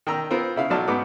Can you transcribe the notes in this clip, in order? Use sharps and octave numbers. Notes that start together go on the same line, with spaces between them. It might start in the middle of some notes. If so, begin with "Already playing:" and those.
D#3 G5 A#5 E6
B3 C4 F4 A#4 C5
C#3 E4 F5
B1 F#3 D#4 D5 A5 F6
G#2 B2 B3 F#5 D6